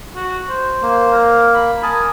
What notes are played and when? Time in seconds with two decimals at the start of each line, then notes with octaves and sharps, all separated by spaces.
0.16 F#4
0.49 C5
0.82 A#3
1.12 A#4
1.54 B5
1.83 A#4 G#5 A5 D#6